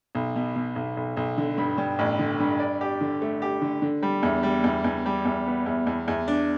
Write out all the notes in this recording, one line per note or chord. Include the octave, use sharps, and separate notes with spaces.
B1
B2
B2
B1
B1
B1
D3
G2
G2
A1
D3
G2
D5
G4
D3
A3
G4
D3
D3
G3
E2
G3
E2
E2
G3
E2
B3
E2
E2
E2
D4